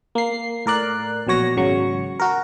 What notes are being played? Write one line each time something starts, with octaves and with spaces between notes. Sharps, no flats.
A#3 C7
A2 A#4 D5 F#6
A#1 B2 F#3 C#5 A#6
G#1 C#3 F#3 C#6
F#4 A#4